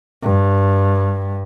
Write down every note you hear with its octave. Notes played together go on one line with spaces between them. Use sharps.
G2